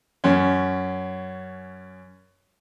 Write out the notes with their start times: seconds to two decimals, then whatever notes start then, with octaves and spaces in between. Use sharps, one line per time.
0.24 F#2 C#4